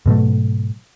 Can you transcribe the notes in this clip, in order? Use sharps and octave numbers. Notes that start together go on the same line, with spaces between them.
G#2 B2 F#3 A3